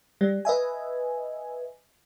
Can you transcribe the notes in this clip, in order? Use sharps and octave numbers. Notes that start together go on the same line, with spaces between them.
G3
B4 D#5 E5 G#5